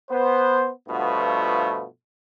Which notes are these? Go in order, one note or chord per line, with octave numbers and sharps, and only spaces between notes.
B3 C5
G2 B2 F3 A3 B3 F4